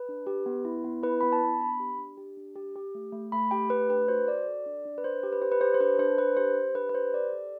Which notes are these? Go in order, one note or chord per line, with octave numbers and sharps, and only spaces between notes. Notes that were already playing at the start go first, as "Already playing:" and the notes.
Already playing: B4
D4
G4
B3
E4
B3
E4 B4
B3 B5
A5
B3
D4 B5
G4
D4
G4
D4
G4
G4
A3
A3
A3 B5
G4 G5
A3 B4
D4 B4
F#4 C5
F#4 D5
A4
D4
D4
B4
D4 C5
G4
B4
G4 C5
B4
G4 C5
C5
D4 B4
D4 C5
D4 B4
G4 C5
G4
D4 B4
B4
G4 C5
G4 D5
A4